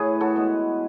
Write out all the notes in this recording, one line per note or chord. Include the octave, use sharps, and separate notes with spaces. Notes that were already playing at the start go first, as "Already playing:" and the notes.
Already playing: A2 E4 G#4 B4 C#5
F#4 A4
E3 G#3 B3